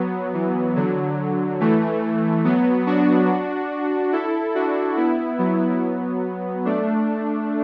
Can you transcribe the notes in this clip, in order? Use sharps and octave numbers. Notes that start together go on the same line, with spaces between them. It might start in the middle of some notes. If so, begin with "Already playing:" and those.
Already playing: F#3 B3
E3
D3 F#3
E3 A3
F#3 B3
D4 F#4
E4 A4
D4 F#4
B3 E4
F#3 B3
A3 D4